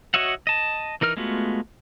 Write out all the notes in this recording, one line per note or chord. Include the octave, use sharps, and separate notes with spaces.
F#4 C#5 D#5 E5 F#5
D#5 A5
E3 D#4 A#4 F6
G#3 A3 B3 F4 F#4